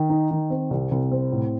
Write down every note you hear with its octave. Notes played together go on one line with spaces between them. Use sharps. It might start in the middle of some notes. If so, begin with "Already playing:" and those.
Already playing: D#3
D#4
D#3
C4
C2
C2
C4
A2